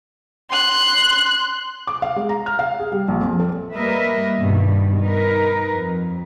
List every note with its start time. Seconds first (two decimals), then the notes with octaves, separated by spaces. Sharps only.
0.51 C6 F#6
1.87 D6
2.02 F5
2.16 G#3
2.29 A#5
2.46 F6
2.59 F5
2.80 G#4
2.92 G3
3.08 A#1
3.21 F2
3.40 A4
3.75 G3 A#3 A#4 B4 D#5 E5
4.37 G2 B2 D#3 G3
5.03 D#4 A#4 B4
5.73 F2